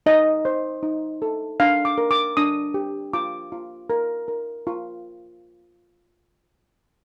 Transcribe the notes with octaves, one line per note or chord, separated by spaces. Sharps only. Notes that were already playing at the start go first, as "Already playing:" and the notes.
D#4 D#5
C5
D#4
A4
D4 F5
D6
A#4
D6
D4 D#6
G4
F4 D6
F4
A#4
A#4
F4